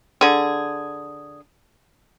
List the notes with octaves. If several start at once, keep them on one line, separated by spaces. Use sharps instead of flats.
D3 G#4